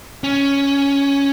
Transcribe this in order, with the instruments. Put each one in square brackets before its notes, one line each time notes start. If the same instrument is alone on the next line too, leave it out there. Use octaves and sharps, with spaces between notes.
[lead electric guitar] C#4